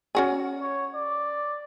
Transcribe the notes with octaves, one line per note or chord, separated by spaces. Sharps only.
C#4 F#4 G#4
C#5
D5